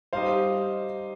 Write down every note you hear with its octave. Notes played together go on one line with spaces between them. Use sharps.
G3 D#4 G4 C5 D#5 F5